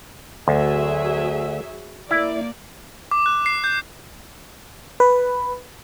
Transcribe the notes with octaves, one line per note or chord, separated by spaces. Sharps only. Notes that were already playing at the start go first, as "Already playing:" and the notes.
D2 F#3 G#4 E5
A#3 E4 D5
D6
F#6
C7
G6
B4